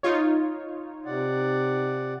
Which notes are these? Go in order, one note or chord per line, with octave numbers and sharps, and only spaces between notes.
D#4 F4 C#5
C3 D5 F#5